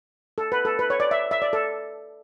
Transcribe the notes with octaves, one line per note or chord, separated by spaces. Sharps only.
A4
B4
A4
B4
C#5
D5
E5
E5
D5
A4